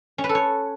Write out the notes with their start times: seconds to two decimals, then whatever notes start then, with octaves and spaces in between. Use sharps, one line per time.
0.18 C#4
0.24 B4
0.29 A4
0.35 C#5